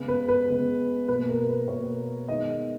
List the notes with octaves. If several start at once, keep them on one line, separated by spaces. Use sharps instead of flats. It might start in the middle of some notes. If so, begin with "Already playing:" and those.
Already playing: C#3 G#3 B3
B4
B4
C#3 G#3 B3
B2 A#3 B4
A#4
B4
B2 A#3 C#5
D#3 G#3 B3 D#5